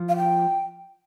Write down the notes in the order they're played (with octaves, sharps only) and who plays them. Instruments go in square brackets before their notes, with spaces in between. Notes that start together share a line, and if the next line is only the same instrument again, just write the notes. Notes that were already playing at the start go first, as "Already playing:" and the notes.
Already playing: [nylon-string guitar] F3 F4
[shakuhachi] F5
G5